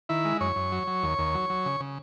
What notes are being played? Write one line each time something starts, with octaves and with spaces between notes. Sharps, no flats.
D#3 E4 E5
G#3
F#2 C#5 C#6
F#2
F#3
F#3
D#2
D#2
F#3
F#3
C#3
C#3